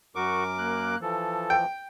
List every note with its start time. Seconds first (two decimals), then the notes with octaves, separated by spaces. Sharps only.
0.15 F#2 F#4 A#4 C#6 D6
0.58 A#3 F#6
1.01 E3 F3 A4
1.50 G5